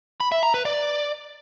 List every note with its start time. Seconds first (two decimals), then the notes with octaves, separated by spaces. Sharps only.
0.21 B5
0.32 E5
0.43 A#5
0.54 B4
0.65 D5